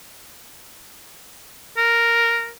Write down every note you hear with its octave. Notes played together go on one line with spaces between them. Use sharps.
A#4